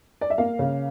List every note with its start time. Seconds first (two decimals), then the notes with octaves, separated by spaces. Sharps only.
0.21 D5
0.30 E5
0.38 A#3 F5
0.59 C#3